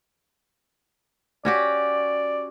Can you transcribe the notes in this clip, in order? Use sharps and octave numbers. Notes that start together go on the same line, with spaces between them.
C#4 F#4 G4 D5